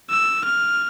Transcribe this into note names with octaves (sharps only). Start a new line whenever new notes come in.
E6
F6